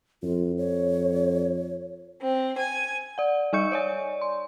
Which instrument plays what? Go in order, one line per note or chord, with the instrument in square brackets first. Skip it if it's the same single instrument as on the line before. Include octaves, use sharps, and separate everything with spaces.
[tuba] F2 [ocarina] F4
[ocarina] C#5
[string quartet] C4
G#5
[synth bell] D5 F#5
G3 D#4 D#5 C#6 G6 C#7
C#5 D5 G#5
C6